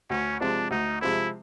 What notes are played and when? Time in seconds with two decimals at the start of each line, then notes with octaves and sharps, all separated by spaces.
0.10 D2 C#4
0.40 C3 F3 G#3 C4 D4
0.71 D2 D#4
1.01 C3 F3 G#3 C4 E4